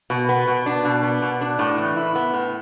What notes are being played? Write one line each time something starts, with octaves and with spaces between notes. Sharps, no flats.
B2
B3
B2
D4
B2
B3
B2
D4
A2
E3
E4
B3
A2